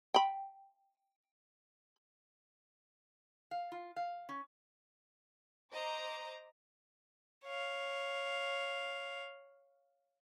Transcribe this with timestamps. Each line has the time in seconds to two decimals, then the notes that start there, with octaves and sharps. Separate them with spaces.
0.14 G5 B5
3.51 F5
3.72 F4
3.96 F5
4.29 C#4
5.73 C5 D#5 A#5 D6
7.45 C#5 F5